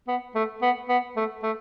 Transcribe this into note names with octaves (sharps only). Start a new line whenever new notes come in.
B3
A3
B3
B3
A3
A3